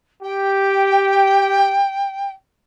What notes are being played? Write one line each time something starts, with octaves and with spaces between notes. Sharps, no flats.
G4 G5